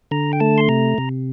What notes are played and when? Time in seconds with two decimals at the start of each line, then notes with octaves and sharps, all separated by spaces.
0.11 D3 A#5
0.33 G5
0.40 A3 A5
0.58 C6
0.68 C3 A#5
0.98 C3